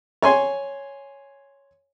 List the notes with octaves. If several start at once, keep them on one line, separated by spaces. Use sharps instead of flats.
C#5 G#5 C6